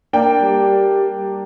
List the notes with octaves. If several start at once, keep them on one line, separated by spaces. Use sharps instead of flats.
A#3 D4 G5
G3